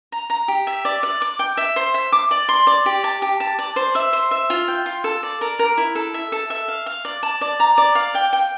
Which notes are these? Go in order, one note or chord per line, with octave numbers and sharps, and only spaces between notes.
A#5
A#5
G4
E5
D5
D5
D6
G5
E5
C5
E5
D6
D5
C6
D5
G4
A5
G4
A5
D5
C5
E5
C5
E5
F4
G5
F4
A4
D5
A#4
A#4
E4
A4
E5
A4
E5
F5
F5
D5
A5
D5
A#5
D5
F5
G5
G5